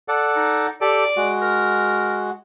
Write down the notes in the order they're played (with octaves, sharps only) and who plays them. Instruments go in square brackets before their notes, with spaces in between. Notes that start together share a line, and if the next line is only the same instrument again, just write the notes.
[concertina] A4 D5 F#5
[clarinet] D#4
[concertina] G4 A4 [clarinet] D5
[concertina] G#3 F#4
[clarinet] A#4